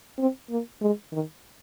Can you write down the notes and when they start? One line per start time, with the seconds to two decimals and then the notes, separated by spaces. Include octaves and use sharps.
0.19 C4
0.50 A#3
0.81 G#3
1.13 D#3